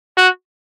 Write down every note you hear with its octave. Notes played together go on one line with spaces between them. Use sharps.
F#4